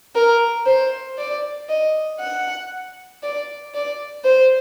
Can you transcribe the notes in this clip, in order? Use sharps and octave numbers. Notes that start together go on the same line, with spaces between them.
A#4
C5
D5
D#5
F#5
D5
D5
C5